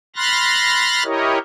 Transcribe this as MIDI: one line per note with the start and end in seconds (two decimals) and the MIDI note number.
0.16 1.03 83
0.16 1.03 84
0.16 1.03 89
0.16 1.03 90
0.16 1.03 93
0.16 1.03 94
1.04 1.38 64
1.04 1.38 67
1.04 1.38 70
1.04 1.38 73
1.04 1.38 75